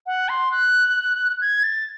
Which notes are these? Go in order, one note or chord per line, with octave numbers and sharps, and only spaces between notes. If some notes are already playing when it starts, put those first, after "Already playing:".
F#5
C6
F#6
G#6
A6